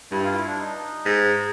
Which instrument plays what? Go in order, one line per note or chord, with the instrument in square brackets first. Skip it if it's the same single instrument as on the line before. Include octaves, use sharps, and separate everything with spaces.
[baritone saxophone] G2 [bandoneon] E4
[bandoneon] F4
E4
D4
D#4
[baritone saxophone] G#2